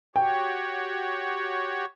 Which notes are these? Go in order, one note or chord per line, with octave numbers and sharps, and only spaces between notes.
F#4 G4 C#5 G5